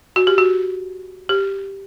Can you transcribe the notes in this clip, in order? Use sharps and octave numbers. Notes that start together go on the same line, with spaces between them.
F#4
G4
F#4
G4